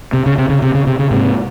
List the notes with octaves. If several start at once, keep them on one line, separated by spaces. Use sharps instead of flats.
C3
C#3
C3
C#3
C3
C#3
C3
C#3
G#2 C3